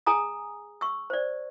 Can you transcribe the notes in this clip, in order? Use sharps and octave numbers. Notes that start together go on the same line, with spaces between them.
G#4 G#5 A#5 D#6
C#6 E6
C5 D5